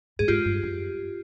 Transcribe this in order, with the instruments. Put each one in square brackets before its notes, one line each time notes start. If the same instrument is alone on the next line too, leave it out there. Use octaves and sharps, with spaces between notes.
[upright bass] A2 [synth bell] G#4
[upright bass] G#2 [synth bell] F4 G4
[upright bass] G2
F#2